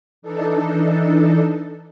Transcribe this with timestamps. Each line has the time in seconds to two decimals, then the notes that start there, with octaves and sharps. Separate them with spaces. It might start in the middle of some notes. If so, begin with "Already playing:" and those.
0.22 E3 D4 D#4 A4